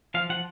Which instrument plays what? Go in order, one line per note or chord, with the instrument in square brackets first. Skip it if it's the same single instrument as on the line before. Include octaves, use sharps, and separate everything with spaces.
[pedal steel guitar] F3 F5
F3 F#5